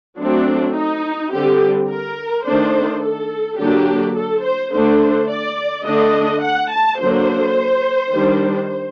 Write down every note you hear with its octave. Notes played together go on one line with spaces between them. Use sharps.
F#3 A3 C4 D4
D#4
D3 G3 C4 G4
A#4
D#3 A3 D4 C5
A4
D3 F#3 A#3 D4 G4
A4
C5
D3 A3 D4 C5
D5
D3 A3 D4 D#5
F#5
A5
D3 F#3 A#3 D4 C5
D#3 G3 D4